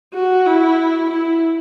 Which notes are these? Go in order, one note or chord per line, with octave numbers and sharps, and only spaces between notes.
F#4
E4
E4